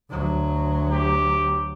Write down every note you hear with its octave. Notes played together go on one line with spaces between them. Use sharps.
D2 F#3
G4